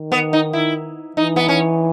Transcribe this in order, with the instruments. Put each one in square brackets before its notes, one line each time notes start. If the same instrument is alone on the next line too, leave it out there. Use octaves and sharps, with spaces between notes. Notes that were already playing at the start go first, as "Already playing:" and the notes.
Already playing: [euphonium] D#3
[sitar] B3
D#4
E4
[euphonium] E3 [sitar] D#4
[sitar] B3
C#4